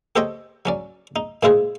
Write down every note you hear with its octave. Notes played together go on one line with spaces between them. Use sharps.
G4 A4 C5 C#5 D#5 G5
F#3 C#4 D5
D#4
A#2 G#3 E4 F4 G#4 C5